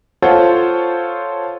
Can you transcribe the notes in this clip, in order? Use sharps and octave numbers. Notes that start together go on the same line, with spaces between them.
F4 A4 C5 C#5 F#5